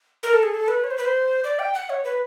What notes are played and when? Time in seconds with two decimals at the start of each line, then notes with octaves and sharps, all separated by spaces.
0.23 A#4
0.33 A4
0.43 G#4
0.54 A4
0.68 B4
0.84 C#5
0.91 C5
0.98 B4
1.05 C5
1.44 D5
1.59 G5
1.75 F#5
1.90 C#5
2.04 B4